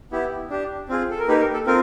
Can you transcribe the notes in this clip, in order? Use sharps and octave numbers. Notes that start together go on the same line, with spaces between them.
B3 E4 G4
D4 G4
C4 F4 G#4
A4
A#4
A#3 D#4 G4 B4
A#4
A4
C4 F4 A#4